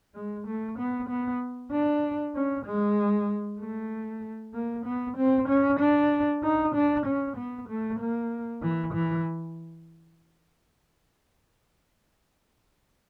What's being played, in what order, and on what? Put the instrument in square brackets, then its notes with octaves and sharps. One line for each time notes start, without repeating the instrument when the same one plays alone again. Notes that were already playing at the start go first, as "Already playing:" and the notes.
[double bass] G#3
A3
B3
B3
D4
C#4
G#3
A3
A#3
B3
C4
C#4
D4
D#4
D4
C#4
B3
A3
A#3
E3
E3